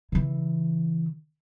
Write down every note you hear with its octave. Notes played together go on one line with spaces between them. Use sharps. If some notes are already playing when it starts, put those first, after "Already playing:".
C#3 E3